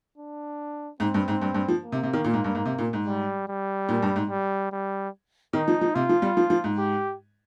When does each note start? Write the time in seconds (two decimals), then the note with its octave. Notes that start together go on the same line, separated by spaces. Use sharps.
0.18 D4
1.00 G#2 C4
1.14 G2
1.28 G#2
1.42 G2
1.55 G2
1.68 F3
1.83 A#3
1.92 C3
2.03 C3
2.13 D#3
2.24 A#2
2.34 G#2
2.44 G2
2.55 G#2
2.65 C3
2.79 A#2
2.93 G#2
3.06 G3
3.48 G3
3.89 A#2
4.03 G2
4.16 G#2
4.30 G3
4.72 G3
5.53 D#3 D#4
5.68 F3
5.81 F3
5.95 C3 F4
6.09 F3
6.22 G3
6.37 F3
6.50 F3
6.64 G#2
6.78 G4